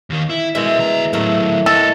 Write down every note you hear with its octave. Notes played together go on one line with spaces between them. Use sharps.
D#2 D#3
E4
B2 G#3 E4 A#4 E5
D2 A#5
A2 F#3 A3 E4 A#4
A3 A4 D#5